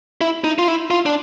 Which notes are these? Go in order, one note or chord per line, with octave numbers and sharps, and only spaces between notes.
E4
D#4
F4
E4
F4
D4